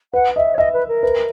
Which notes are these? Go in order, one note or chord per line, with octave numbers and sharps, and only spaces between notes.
B4 F#5
D#5 E5
C#5
D#5 E5
B4
A#4
B4